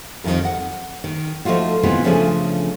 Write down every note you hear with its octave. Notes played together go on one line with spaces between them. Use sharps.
F2 D#3 G#3 F4 A#4
F#5
D#3
F3 A3 D#4 F4 F#4
C3 D#3 E3 G#3 B3 F4
C#3 F3 A3 C#4 D4 G#4